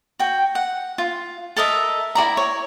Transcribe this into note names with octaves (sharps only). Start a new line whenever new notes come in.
F#4 G5
F#5
F4
A4 A#4 D#5 E5
E4 F#4 D5 A#5
C#5